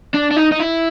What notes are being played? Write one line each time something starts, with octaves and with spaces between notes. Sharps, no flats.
D4
D4
D#4
D#4
E4